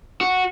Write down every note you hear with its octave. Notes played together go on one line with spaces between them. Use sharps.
F#4